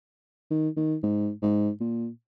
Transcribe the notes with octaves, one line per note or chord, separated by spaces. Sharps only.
D#3
D#3
G#2
G#2
A#2